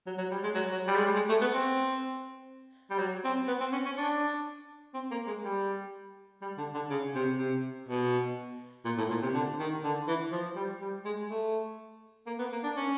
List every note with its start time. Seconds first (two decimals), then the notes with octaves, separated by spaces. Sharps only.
0.06 F#3
0.18 F#3
0.31 G3
0.43 G#3
0.54 F#3
0.72 F#3
0.88 G3
0.96 G#3
1.04 G3
1.16 G#3
1.29 A3
1.41 B3
1.53 C4
2.90 G3
2.99 F#3
3.24 C4
3.48 B3
3.60 C4
3.72 C#4
3.85 C#4
3.97 D4
4.94 C4
5.11 A#3
5.27 G#3
5.43 G3
6.42 G3
6.58 D3
6.74 D3
6.90 C#3
7.15 C3
7.39 C3
7.88 B2
8.85 A#2
8.98 A2
9.10 A#2
9.23 C3
9.34 D3
9.59 D#3
9.83 D3
10.07 E3
10.32 F3
10.56 G3
10.81 G3
11.05 G#3
11.30 A3
12.27 A#3
12.39 B3
12.52 A#3
12.63 D4
12.77 C#4